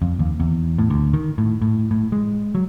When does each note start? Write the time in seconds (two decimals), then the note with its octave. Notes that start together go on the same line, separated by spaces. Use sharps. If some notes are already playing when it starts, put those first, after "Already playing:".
0.02 F2
0.19 D#2
0.40 E2
0.78 A2
0.90 D2
1.13 D#3
1.38 A2
1.62 A2
1.91 A2
2.12 G#3
2.55 F#3